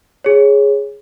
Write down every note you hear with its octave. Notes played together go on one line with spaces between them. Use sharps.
G#4 C#5